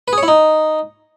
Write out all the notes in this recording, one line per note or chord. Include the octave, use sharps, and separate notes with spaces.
B4
G#4
C#5
E4
D#4